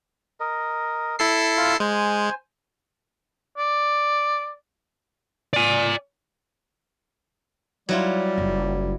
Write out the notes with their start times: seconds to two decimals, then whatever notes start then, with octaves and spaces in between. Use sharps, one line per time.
0.40 A#4 D#5
1.19 E4 A4 C7
1.57 F4
1.80 G#3 C5 G#5
3.58 D5
5.53 D5 G#5
7.89 F#3 G3 E4 F4
8.38 F#1